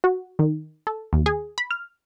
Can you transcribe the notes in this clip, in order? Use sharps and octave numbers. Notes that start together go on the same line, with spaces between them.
F#4
D#3
A4
D#2
G#4
B5
F6